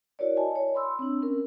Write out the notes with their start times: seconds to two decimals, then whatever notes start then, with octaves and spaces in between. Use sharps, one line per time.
0.19 E4 F#4 A#4 C#5 D5
0.37 D#5 G#5 A5
0.55 C#5
0.74 B5 C6 E6
0.99 C4 D4
1.22 C#4 A#4